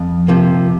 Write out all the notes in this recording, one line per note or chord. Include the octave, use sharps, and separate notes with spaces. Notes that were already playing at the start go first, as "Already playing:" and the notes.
Already playing: F2
C3 F3 A#3